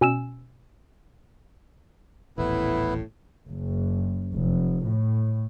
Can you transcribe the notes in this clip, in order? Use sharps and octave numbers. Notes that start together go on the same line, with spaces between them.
B2 C#4 G#5 E6 E7
D#1 A1 A2 B3 E4 B4
F#1
F1
A2